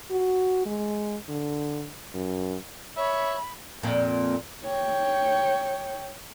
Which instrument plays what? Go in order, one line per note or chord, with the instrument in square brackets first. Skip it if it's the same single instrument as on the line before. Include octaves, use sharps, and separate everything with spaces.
[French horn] F#4
G#3
D3
F#2
[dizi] C#5 [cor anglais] E5 [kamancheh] B5
[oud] F2 A#2
[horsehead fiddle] C#5 G5